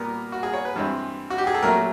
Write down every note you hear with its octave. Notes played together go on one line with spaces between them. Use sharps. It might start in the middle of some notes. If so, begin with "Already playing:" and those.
Already playing: A#2 G3 B3 A#4
F#4
G#4
C#5
B4
G2 E3 G#3 C4
F#4
G4
G#4
A4
A#2 F#3 A3 C#4 A#4